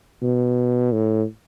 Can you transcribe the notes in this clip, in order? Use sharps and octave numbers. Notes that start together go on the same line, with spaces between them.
B2
A2